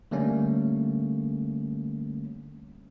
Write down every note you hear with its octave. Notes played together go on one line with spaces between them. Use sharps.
D3 G3 A3 A#3 C#4